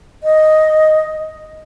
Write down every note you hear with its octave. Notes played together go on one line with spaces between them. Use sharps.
D#5